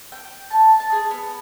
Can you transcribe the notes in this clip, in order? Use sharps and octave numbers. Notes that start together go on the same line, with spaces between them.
G5
A5
A5
G#4
B3